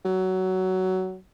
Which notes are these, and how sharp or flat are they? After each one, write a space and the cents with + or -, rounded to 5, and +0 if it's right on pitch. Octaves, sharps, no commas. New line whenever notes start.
F#3 +15